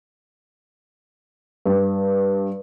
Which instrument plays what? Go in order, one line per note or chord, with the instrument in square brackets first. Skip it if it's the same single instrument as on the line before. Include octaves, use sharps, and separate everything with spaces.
[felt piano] G2